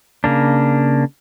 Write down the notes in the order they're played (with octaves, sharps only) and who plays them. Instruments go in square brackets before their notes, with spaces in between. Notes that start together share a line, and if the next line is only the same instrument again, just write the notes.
[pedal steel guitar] C#3 A#3 D4